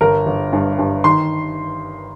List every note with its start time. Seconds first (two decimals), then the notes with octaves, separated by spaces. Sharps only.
0.01 G1 A#4
0.26 G1
0.53 G2
0.78 G2
1.04 D#3 C6